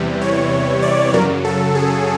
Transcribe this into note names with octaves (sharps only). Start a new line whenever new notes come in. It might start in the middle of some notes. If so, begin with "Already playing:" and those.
Already playing: E2 C3 E3 G3
C#5
D5
F#2 C#3 F#3 A#4
A4
G#4